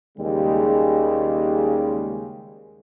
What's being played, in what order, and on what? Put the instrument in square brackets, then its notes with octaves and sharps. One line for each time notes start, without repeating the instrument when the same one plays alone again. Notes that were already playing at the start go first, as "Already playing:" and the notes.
[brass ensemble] D#2 C#3 G3 G#3